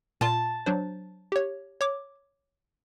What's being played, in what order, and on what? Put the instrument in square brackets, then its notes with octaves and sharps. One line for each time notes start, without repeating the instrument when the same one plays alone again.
[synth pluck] A#2 F4 [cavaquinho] A5
[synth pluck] F#3 D4 C5
G4 C#5
C#5 D6